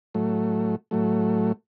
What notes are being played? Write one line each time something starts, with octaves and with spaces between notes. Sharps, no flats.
A2 F#3 A3
A2 F#3 A3